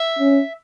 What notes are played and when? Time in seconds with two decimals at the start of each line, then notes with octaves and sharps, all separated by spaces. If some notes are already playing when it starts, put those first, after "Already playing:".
Already playing: E5
0.19 C#4